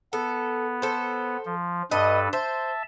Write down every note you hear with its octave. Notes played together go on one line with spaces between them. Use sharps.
B3 A4
A4 C5
F3
G2 A4 B4 D#5
C5 E5 A5